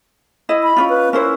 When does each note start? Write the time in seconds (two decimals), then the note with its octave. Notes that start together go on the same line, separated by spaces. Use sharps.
0.49 E4 D#5
0.63 B5
0.76 C#4 D#4 F4
0.89 B4
1.13 C#4 E4 A#4 C5